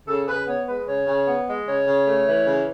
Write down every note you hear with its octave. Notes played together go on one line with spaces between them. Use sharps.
C#3 A4
C#3 B4
B3 C#5
G#3 B4
C#3 C#5
C#3
B3
G#3
C#3 C#5
C#3
A3
E3
C#3